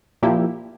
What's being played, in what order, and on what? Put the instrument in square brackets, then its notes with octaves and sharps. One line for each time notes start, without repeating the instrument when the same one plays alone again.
[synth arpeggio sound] A#2 F3 A#3 E4 G4